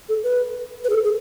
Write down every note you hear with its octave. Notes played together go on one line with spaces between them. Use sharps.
A4
B4
B4
G#4
A4
G#4